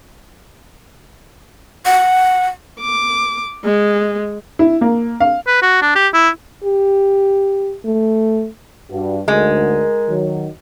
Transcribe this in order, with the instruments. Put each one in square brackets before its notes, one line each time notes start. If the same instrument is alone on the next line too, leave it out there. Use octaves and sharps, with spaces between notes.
[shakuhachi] F#5
[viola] D6
G#3
[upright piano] E4
A#3
F5
[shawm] B4
F#4
D4
G4
E4
[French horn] G4
A3
[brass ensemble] G2 [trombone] F#4
[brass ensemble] D2 G#2 D3 [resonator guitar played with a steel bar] G#3 [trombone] A#4
[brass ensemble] D#3 F#3